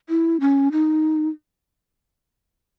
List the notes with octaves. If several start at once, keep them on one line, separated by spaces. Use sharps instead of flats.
E4
C#4
D#4